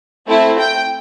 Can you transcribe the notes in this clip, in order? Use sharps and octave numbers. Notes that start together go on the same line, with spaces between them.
A3 C4 E4
G5